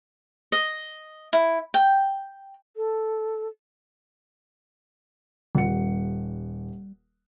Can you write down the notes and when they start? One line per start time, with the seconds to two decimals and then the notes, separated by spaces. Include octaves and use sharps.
0.52 D#5
1.33 E4
1.74 G5
2.76 A4
5.55 D#1 G3 F#5 C#7